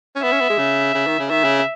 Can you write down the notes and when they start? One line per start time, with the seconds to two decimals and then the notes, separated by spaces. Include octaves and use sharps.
0.15 C#4
0.22 B3 E5
0.32 C#4
0.40 B3
0.50 G#3
0.58 C#3
0.94 C#3
1.07 D#3
1.19 C#3
1.29 D#3 E5
1.44 C#3